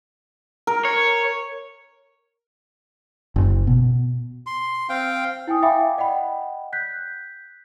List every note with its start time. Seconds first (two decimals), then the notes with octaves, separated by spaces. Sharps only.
0.67 A#4
0.85 C#5
3.36 F#1
3.67 B2
4.46 C6
4.89 C4 F5 G5
5.47 E4 G5 G#5 D#6
5.63 E5 F5 G5 G#5 B5 D6
5.97 D5 D#5 F#5 G5 B5
6.73 F#6 G6 B6